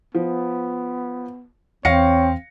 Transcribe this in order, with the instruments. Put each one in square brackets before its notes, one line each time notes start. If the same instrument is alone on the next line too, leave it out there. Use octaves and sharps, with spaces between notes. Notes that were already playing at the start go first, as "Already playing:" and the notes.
[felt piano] F3 [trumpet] B3
[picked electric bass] E2 [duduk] C4 [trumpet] C#5 [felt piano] F5 A#6 C#7